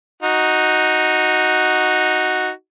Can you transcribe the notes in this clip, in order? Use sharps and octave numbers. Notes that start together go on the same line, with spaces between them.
D#4 F#4